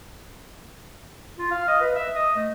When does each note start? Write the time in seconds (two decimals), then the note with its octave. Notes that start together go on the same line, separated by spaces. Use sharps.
1.39 F4
1.51 F5
1.68 D#5
1.81 B4
1.95 E5
2.16 D#5
2.36 A3